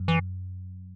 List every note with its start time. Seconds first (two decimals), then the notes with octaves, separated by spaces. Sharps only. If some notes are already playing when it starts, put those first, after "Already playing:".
Already playing: F#2
0.08 E3